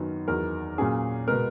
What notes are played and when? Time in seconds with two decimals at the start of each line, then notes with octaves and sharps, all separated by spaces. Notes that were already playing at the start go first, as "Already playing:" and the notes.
Already playing: F#2 D#3 F#3 B3
0.28 E2 D#3 F#3 A#4
0.78 A#2 F#3 A#3 C#4 G#4
1.28 B2 G#3 B3 A#4